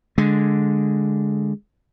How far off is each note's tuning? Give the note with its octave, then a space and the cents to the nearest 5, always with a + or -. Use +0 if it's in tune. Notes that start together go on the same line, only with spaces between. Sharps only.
D3 -5 G#3 +0